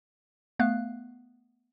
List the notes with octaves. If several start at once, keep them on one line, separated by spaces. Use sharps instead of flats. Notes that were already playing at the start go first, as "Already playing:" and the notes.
A3 B3 F5 F#6